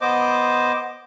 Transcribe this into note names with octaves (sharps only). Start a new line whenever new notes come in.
B3 C5 D#5 D6